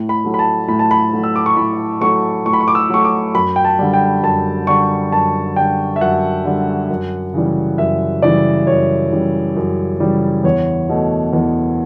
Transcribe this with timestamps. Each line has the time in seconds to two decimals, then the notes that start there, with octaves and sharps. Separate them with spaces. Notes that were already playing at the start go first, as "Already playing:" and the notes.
Already playing: A2
0.09 B5
0.24 F#3 A3
0.34 B5
0.39 A5
0.68 A2 B5
0.79 A5
0.91 B5
1.12 F#3 A3
1.24 E6
1.36 D6
1.46 C#6
1.57 A2 B5
2.01 F#3 A3 C#6
2.46 A2 C#6
2.53 B5
2.61 C#6
2.68 D6
2.75 E6
2.90 F#3 A3 C#6
3.04 D6
3.34 F#2 B5
3.56 G5
3.65 A5
3.79 D3 G3
3.94 G5
4.23 F#2 A5
4.67 D3 G3 C#6
5.12 F#2 A5
5.56 D3 G3 G5
5.96 E5
6.01 F#2 F#5
6.45 D3 G3
6.90 F#2
7.34 C#3 E3 G3
7.78 F#2 E5
8.22 C#3 E3 G3 D5
8.67 F#2 C#5
9.11 C#3 E3 G3
9.56 F#2
10.00 C#3 E3 G3
10.44 E2 C#5
10.89 B2 A3
11.33 E2